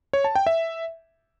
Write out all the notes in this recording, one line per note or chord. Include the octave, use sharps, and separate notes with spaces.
C#5
A5
G5
E5